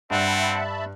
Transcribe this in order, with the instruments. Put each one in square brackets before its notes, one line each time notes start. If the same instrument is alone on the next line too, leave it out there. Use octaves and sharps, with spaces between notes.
[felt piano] G2 [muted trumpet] C4 [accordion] E5 A5 B5 [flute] F#5